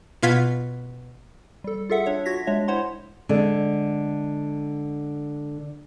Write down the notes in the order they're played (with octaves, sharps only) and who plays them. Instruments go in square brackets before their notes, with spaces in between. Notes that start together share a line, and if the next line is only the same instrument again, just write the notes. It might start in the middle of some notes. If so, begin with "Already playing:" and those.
[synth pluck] B2 F4 G#6 B6
[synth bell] G3 A4
F4 G#4 A4 E5 F#5
D4 C#5 E5
F4 F#4 G#6 A#6 B6
G#3 D4 C#5 E5
E4 C5 C#5 F#5 C6
[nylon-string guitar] D3 G#3